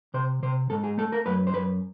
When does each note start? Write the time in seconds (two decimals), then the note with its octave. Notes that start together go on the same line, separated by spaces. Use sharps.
0.14 C3 C5
0.43 C3 C5
0.70 G#2 A4
0.84 G#4
0.98 A3 A4
1.12 A#4
1.26 F#2 B4
1.47 C5
1.54 F#2 B4